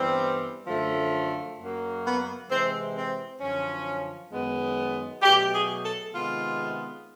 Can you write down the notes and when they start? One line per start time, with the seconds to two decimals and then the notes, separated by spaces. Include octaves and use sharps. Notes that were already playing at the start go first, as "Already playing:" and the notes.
Already playing: G2 E3 G3 B3 C4
0.68 F#2 D3 F3 A3
1.59 F#2 C#3 F#3 A#3
2.04 B3
2.49 C3 E3 G#3 C4
2.95 C4
3.40 F#2 D3 F3 C#4
4.32 F#2 D#3 G#3 B3
5.23 B2 F#3 A3 G4
5.53 G#4
5.83 A4
6.13 C3 D#3 G#3 B3 F4